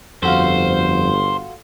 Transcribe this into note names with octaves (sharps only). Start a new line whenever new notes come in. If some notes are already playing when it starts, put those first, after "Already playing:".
G1 F2 F4 F#4 A4 C5